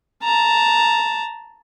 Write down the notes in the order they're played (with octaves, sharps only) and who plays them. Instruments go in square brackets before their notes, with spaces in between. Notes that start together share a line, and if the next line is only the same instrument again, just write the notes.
[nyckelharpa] A5 A#5